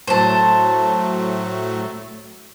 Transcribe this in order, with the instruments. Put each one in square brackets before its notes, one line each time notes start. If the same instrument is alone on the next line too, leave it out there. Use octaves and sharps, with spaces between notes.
[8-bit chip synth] A2 F#3 A3 [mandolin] C5 A5